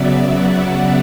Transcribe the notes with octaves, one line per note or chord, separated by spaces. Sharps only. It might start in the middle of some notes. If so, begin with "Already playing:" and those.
Already playing: C#3 F#3 B3 D5 E5
E5 F#5